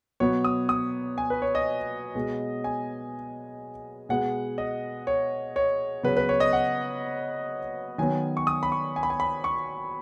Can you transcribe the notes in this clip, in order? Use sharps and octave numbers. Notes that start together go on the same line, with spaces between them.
B2 F#3 B3 C#5
D#6
D#6
G#5
B4
C#5
D#5
B2 G#3 B3
G#5
B2 G#3 B3 F#5
D#5
C#5
C#5
C#3 F#3 B3 B4
B4
C#5
D#5
F#5
D#3 F#3 B3 G#5
C#6
D#6
B5
C#6
G#5
B5
G#5
B5
C#6